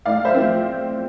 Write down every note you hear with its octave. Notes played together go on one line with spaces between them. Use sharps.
A2 D5 F5
C5 E5
F3 C4